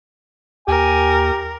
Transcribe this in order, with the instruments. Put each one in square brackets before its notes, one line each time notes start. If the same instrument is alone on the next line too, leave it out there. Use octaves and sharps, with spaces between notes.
[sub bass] D#2 [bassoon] G4 [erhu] A#4 [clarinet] G#5